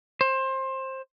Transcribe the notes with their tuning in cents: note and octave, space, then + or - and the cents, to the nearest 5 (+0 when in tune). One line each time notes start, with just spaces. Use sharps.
C5 +20